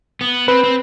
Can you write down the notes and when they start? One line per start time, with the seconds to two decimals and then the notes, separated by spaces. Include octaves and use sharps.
0.21 B3
0.48 C4 B4
0.64 C4